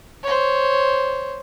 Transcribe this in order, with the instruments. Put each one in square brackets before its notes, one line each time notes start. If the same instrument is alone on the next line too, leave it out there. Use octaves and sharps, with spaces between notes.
[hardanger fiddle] C5 C#5